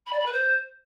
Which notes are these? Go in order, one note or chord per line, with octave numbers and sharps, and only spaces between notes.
B5
D5
B5
B4
C5